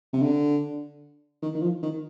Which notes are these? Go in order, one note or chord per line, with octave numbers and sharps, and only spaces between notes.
C3
D3
D#3
D#3
F3
D#3